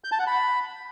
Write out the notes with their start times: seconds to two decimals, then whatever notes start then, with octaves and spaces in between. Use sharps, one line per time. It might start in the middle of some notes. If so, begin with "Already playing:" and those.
0.04 G6
0.12 A5
0.19 F#5
0.27 B5